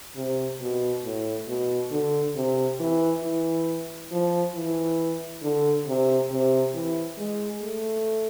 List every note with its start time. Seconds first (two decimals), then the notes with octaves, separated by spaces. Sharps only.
0.16 C3
0.61 B2
1.04 A2
1.48 B2
1.91 D3
2.36 C3
2.80 E3
3.23 E3
4.11 F3
4.55 E3
5.43 D3
5.87 C3
6.31 C3
6.75 E3
7.18 G#3
7.62 A3